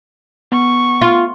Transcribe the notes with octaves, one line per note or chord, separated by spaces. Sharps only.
B3 C#6
F4